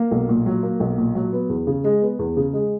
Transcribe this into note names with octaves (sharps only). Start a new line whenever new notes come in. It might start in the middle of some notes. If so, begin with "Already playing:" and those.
Already playing: A#3
B1
A#2
F#3
A#3
B1
A#2
F#3
B3
E2
C#3
G#3
B3
E2
C#3
G#3